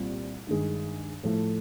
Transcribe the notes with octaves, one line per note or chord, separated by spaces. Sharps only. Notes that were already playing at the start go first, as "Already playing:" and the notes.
Already playing: C2 A#2 G3 C4 F4
G2 D#3 G#3
A2 F3 A3